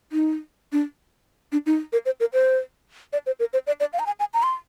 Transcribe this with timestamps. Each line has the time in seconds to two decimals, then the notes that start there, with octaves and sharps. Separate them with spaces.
0.12 D#4
0.72 D4
1.52 D4
1.66 D#4
1.93 A#4
2.05 C5
2.20 A#4
2.33 C5
3.13 D5
3.26 C5
3.40 A#4
3.53 C5
3.67 D5
3.80 D5
3.93 F5
3.99 A#5
4.06 G#5
4.20 G#5
4.34 A#5
4.43 C6